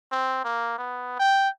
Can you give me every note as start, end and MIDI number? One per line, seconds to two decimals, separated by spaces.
0.12 0.43 60
0.45 0.78 58
0.78 1.18 59
1.20 1.49 79